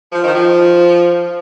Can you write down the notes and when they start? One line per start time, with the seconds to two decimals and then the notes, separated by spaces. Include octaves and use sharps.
0.12 F3
0.24 D#3
0.35 F3